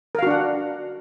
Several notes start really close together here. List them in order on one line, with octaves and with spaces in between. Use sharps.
A#4 F5 F#4 D4 F#5